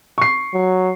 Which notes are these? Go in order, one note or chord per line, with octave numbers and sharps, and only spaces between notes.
C#6 C7
F#3